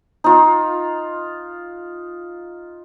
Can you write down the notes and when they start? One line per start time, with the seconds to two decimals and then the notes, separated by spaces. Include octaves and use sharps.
0.24 D#4 F4